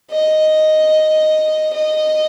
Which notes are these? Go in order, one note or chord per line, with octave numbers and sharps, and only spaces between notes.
D#5
D#5